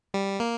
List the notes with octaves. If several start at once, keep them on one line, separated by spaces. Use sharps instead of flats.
G3
A#3